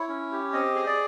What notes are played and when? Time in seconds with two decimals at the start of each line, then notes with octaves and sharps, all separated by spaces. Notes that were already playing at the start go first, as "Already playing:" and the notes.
Already playing: E4 C#5
0.09 C#4
0.32 G4
0.53 C4 D#5
0.75 G#4
0.87 D5